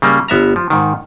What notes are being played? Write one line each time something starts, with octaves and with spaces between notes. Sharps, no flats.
C#3 G3 A#3
G1 B3 E5 A#5
F3
G#2 D#3